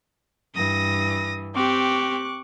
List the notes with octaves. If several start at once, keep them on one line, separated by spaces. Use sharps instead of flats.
G2 E3 D#6 A#6
C4 G4 C#6 D6 F#6